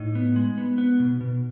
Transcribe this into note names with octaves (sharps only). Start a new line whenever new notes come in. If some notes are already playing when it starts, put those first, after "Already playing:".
Already playing: A2 D#4
B3
G#3
B3
B3
B2
B2